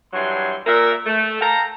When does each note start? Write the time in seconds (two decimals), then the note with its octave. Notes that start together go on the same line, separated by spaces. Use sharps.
0.13 G2 E3 F#3 G#5 C6
0.67 A#2 A#4 E5
1.06 A3
1.41 A4 F5 G5 A#5